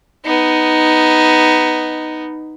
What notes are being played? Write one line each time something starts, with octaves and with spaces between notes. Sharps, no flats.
B3 D#4